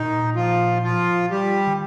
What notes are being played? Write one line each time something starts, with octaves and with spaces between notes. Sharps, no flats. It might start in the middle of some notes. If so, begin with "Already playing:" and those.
Already playing: A#2 D#3 D#4
F3 F4
F3 F4
G3 G4
D#3